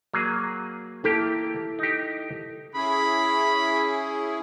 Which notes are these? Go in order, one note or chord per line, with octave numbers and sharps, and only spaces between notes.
F#3 A#3 G#4
A#3 E4 G4 A4
D#4 G4
C#4 E4 G#4 B5